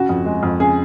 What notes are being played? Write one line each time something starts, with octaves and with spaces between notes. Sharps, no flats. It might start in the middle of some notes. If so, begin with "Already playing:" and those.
Already playing: C#3 F#4
F2
G#3
F2
C#3 G#4